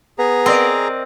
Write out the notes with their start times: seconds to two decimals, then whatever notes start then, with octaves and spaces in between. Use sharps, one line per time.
0.19 B3 G#4 A#5
0.46 C4 A#4 D5 D#5